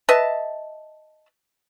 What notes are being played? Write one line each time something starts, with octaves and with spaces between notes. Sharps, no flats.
B4 D#5 E5 A5